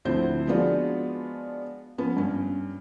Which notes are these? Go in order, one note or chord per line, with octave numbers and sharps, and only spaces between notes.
D2 F3 C4 E4 C5 G6
F3 G#3 B3 D4 F4 F#4
F3 B3 C#4
G2 C#4